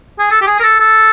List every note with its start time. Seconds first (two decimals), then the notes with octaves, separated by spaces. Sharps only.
0.19 G#4
0.31 A4
0.41 G4
0.47 G#4
0.60 A#4
0.63 A4
0.80 A4